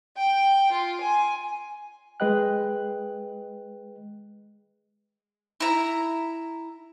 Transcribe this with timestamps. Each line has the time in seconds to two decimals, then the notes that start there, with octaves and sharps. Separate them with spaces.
0.17 G5
0.72 F4
1.01 G#5
2.20 G#3 G#4 B4 D#5 G5 F#6
5.60 E4 A#5